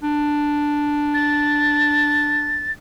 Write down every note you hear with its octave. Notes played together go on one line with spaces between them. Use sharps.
D4
A6